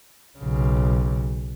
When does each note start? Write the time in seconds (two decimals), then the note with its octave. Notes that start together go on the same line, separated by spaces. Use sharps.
0.38 B1 C#3